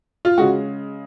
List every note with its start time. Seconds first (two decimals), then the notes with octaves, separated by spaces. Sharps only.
0.25 F4
0.38 C#3 G#3 F#4